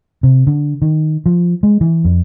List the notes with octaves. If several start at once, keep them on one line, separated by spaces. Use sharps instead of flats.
C3
D3
D#3
F3
G#3
E3
F2